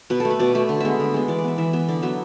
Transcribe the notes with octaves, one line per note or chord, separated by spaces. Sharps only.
B2 B4
A4
A3
B4
B2 D5
A3 E5
D3
G#3 B3 E5
D3
G#3 B3
E3 D5
D5
B3 E5
E3 E5
B3 E5
D3 D5
F#3 B3 E5